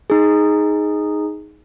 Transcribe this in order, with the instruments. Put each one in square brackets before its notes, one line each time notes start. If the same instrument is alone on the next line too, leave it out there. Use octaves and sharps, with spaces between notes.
[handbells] D#4 G#4